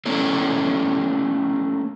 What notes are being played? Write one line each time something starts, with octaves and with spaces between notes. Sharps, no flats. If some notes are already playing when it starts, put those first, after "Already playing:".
A3 A#3 C#4 D4 E4